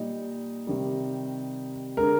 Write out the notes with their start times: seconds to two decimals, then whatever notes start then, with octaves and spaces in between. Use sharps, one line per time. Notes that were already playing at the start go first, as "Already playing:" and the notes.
Already playing: A#2 G3 D#4
0.67 C3 D#3 G3
1.97 D3 G#3 A#4